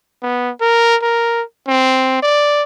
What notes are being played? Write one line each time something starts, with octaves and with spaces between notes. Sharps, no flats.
B3
A#4
A#4
C4
D5